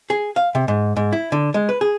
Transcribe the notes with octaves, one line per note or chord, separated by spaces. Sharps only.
G#4
F5
C3
G#2
G#2
E4
D3
G#3
B4
G#4